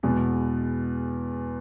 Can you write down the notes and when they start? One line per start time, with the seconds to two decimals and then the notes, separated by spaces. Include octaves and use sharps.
0.03 E2 B2 G#3